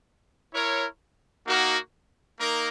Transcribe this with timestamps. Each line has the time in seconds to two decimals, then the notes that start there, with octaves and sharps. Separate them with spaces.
0.53 E4 A#4 C#5
1.45 A#3 D#4 F#4 A#4
2.38 A#3 D#4 A#4